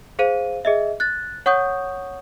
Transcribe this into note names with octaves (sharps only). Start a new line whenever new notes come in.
G#4 C5 F5 D#7
G#4 D#5 E5
F#6 A6
C#5 F#5 C#6 D#6 G6